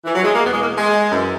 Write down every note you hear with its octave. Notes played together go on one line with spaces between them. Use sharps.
E3
F#3
G#3
A#3
E2 B2 B3
G#3
A#3
G#3
F#2 E3